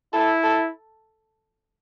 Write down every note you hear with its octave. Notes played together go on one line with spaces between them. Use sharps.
E4 A4
A4